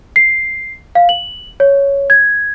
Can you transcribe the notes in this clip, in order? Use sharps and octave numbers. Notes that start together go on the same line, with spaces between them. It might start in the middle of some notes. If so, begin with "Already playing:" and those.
C7
F5
F#7
C#5
G#6